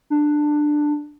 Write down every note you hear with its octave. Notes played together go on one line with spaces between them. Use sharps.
D4